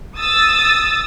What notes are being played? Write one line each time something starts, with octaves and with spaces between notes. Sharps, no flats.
D#6 E6 A6